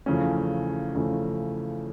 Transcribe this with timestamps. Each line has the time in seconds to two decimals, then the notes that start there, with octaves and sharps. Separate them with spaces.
0.06 E2 C#3 F3 A3 C#4
0.94 E2 C#3 F3 A3 C#4